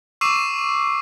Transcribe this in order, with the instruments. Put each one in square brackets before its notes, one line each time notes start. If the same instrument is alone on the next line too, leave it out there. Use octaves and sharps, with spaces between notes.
[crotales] C#6 D6 E6 C7 D#7 E7